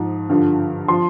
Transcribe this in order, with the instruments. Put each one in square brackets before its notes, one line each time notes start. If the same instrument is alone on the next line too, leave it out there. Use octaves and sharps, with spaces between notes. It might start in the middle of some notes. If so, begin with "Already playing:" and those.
Already playing: [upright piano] G#2 F3
G2 D3 F3
F3 C6